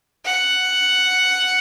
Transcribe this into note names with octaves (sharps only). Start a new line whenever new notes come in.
F#5